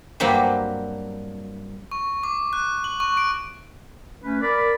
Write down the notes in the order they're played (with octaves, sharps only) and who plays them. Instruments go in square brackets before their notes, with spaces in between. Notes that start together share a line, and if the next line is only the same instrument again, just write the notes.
[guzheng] G2 F#3 A#3 C4 G4
[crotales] C#6
D6
F#6
F#7
C#6
D7
[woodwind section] A3 C#4 B4
[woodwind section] A#4 B5 [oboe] D5